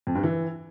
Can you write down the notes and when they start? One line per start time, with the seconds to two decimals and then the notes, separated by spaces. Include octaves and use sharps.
0.07 F2
0.15 G2
0.23 E3